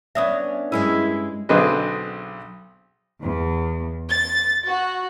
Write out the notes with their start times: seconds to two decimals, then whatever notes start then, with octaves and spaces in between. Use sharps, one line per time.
0.15 B3 C#4 D4 E5 D#6
0.72 G2 G#3 C#4 E4 A#4
1.49 B1 D3 C4 G#4 B4 D#5
3.22 E2
4.08 A6
4.65 F#4